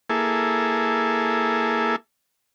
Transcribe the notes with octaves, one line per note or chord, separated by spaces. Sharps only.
A#3 E4 G#4 A4